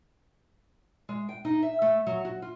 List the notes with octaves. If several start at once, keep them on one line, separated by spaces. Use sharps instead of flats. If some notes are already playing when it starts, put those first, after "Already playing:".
G#3
G5
D#4
E5
A3
F#3
F#4
F4